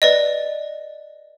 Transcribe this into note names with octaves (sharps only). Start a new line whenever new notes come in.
B4 D5 D#5